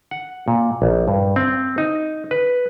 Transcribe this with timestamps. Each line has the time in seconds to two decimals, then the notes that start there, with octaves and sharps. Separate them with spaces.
0.11 F#5
0.48 A#2
0.82 A#1
1.08 G2
1.36 C4
1.78 D#4
2.31 B4